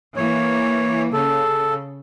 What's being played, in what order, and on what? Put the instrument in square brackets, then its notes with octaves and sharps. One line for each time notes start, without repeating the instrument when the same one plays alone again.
[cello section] E3 A#3 [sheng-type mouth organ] C#5
[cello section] C#3 [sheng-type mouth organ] A4